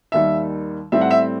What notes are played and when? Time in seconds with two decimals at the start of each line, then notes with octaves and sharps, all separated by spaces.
0.12 D#2 D#3 G3 E5
0.92 A2 G3 C4 E5
1.01 F#5
1.11 E5